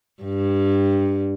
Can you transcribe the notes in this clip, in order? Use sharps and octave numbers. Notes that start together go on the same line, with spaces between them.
G2